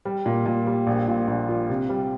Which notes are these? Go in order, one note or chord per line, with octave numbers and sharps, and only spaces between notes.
G3
A#2
A#2
G3
A#1
A#2
A#1
F4
C3
G3